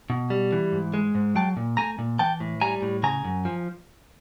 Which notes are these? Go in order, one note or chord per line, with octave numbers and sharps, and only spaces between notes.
B2
G3
E3
G#2
G#3
G#2
F#3 G5 A5
A#2
A3 G#5 A#5
A#2
E3 G5 A5
A2
G3 G#5 A#5
A2
C#3 G#5 A#5
F#2
F3